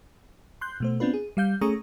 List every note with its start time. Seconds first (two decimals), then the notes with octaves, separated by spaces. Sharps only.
0.61 C6 F#6 G6
0.80 B2 A3 C5
1.00 B3 C4 D4 F4 B4
1.14 G#4
1.37 G3 F5 G6
1.61 A3 C#4 G#4 A#5 C#6 D#6